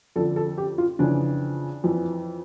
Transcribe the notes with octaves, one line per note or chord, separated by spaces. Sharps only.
F2 D3 F3 A4
A4
G4
F4
F2 C#3 E3 D4
F2 E3